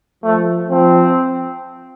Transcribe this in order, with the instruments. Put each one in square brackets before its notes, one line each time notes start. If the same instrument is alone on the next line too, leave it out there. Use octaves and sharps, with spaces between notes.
[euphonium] F3 [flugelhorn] A3
[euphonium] F3 [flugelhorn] C4